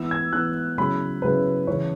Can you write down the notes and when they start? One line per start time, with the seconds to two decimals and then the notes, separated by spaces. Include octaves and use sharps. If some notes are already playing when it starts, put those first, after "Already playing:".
Already playing: E3 B3 E4 E6
0.11 G#6
0.33 E3 B3 E4 F#6
0.78 C#3 F#3 E4 B5
1.22 C#3 F#3 E4 B4
1.67 C#3 E3 C#4 C#5